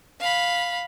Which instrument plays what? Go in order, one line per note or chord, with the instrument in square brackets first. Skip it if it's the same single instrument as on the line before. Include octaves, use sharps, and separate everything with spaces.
[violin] F5 B5